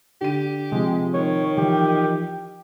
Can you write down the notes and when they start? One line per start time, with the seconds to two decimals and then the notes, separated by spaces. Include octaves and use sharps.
0.21 D3 G4 D#7
0.72 C3 F3 G#3
1.14 D#3 C#5
1.57 E3 F3 G4